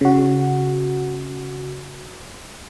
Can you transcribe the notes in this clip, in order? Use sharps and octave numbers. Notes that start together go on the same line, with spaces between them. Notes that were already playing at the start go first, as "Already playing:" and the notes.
C#3 F#4